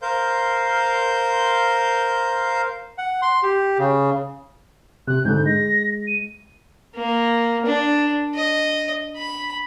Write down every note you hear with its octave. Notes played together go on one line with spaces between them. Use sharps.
A#4 C5 F5 G6
F#5
C6
G4
C#3
C3 F#6
G#2 D3 G6
G#3 A#6
D#7
A#3
D4
D#5
B5